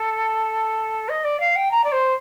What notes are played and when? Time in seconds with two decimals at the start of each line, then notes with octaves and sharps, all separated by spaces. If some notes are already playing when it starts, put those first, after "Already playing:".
Already playing: A4
1.09 D#5
1.24 D5
1.40 F5
1.56 G5
1.71 A#5
1.84 D5
1.92 C5